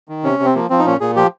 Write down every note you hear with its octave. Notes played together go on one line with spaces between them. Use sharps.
D#3
C3 C#4
C3
C4
F3 A#3
F3 C4
D#4
A#2 C#4
A#2 G#4
F3 G4